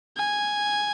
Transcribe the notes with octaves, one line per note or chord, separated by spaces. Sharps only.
G#5